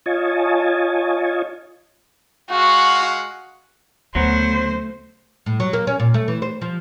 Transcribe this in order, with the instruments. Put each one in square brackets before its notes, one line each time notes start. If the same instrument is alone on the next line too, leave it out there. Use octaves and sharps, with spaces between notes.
[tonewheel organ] F4 C#5 D#5 G#5 A5
[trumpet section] G#3 F5 F#5 [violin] F#4
[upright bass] D2 C#3 [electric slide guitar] F#3 B3 F#4 [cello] A3 [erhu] C5
[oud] A2
F#3
A#3
C#4
A#2
A3
E3
C5
F3